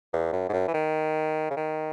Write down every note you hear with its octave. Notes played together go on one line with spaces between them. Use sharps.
E2
F#2
G#2
F#2
E3
D#3
C#3
D#3